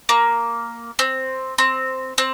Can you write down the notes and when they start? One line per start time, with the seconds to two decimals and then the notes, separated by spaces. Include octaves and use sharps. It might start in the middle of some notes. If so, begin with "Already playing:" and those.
0.09 A#3
0.99 C4
1.58 C4
2.18 C4